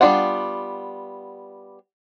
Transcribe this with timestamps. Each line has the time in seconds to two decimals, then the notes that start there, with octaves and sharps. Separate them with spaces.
0.01 G3 B3 D4 F4 F#5